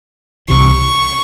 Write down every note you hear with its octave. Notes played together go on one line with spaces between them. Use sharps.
C2 C3 E3 C#6